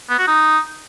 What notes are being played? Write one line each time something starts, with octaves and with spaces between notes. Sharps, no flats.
B3
F#4
D#4